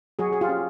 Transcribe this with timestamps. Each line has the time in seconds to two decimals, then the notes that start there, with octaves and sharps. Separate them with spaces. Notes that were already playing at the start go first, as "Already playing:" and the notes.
0.19 F#3 F#4 G#4
0.33 G#4
0.41 F4 G4
0.49 C#4